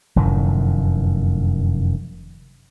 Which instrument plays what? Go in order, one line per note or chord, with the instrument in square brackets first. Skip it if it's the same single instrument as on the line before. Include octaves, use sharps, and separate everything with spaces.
[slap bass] F1 F#2 A2 D#3